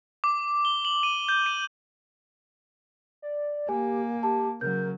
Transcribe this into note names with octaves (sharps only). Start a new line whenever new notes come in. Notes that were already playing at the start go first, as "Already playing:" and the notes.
D6
G7
F#7
D#7
G6
D#7
D5
A#3 G4 G#5
G4 A5
C#3 F#3 A#4 G6